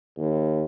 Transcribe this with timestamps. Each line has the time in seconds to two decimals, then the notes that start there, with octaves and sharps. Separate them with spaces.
0.17 D#2